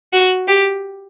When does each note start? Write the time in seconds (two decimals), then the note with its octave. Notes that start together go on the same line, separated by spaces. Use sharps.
0.13 F#4
0.48 G4